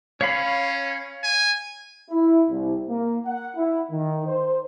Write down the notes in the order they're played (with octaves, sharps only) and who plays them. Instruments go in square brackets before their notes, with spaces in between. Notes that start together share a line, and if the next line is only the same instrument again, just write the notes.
[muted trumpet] C#4 [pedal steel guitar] C#5 F5 B5
[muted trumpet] G#5
[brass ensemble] E4
C2
A#3
F#5
E4
D#3
C5